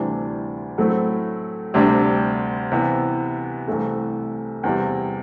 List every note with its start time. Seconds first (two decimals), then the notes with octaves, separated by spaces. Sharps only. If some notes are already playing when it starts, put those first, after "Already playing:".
Already playing: D2 C3 E3 G3 D4
0.78 A2 F#3 A3 C4 E4
1.74 D2 C3 G3 D4
2.72 C3 E3 B3
3.68 C2 C3 E3 A3
4.63 E2 C3 G3